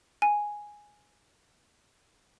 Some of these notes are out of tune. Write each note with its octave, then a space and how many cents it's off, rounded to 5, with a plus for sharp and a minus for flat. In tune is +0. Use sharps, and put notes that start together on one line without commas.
G#5 +0